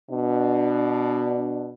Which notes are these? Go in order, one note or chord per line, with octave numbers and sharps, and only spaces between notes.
B2 D4